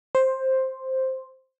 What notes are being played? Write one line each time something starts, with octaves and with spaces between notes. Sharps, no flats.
C5